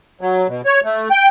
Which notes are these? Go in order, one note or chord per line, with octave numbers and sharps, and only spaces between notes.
F#3
B2
C#5
A3
G5